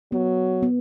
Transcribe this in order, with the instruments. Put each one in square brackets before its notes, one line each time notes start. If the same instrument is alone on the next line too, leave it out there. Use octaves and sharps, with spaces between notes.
[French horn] F#3 [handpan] B3
[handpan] B3